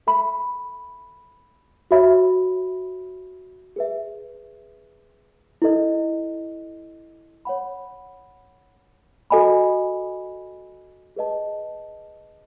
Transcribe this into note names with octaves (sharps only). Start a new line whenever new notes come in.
A4 E5 B5
F#4 C#5 E5 B5
G#4 B4 E5
E4 A4 D#5
C#5 F#5 B5
F#4 A4 D#5 G#5 B5
G#4 B4 D#5 A5